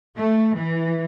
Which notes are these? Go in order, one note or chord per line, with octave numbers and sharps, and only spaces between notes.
A3
E3